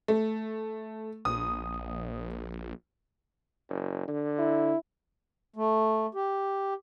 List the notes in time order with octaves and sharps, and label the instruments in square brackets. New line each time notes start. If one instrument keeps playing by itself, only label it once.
[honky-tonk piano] A3
[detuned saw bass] A#1 [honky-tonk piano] D#6
[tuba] F#1
D3
[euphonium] E4
[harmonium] A3
G4